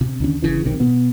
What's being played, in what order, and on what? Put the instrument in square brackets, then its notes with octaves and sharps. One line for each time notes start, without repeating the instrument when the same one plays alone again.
[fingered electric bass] C3
D#2 D3 C#4
G1 C#3 E3
F#1 B1 C3 D#3
B2 B3